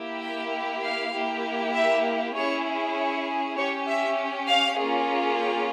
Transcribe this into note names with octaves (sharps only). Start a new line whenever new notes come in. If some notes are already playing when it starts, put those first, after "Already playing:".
Already playing: A#3 E4 G4
G5
F5
A#3 E4 G4
E5
C#4 E4 G#4 C#5
C#5
C#4 G4 C#5
E5
F5
A#3 C#4 F4 G#4
G5